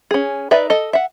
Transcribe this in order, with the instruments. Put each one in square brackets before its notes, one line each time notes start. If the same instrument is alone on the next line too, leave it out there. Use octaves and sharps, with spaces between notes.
[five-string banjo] C#4 G#4
D#4 B4 D5 E5
A4 D#5
E5 F#5